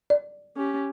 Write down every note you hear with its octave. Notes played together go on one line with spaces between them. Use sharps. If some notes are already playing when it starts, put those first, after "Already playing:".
D5
C#4 G4